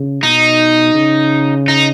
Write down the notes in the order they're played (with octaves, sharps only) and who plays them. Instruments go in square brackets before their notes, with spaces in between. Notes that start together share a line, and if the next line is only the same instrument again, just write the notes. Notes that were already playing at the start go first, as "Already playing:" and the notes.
Already playing: [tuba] C#3
[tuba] B2 [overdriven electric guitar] D#4
[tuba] C#3
[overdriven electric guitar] D#4